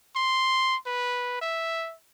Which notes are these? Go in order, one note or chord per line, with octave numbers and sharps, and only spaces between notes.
C6
B4
E5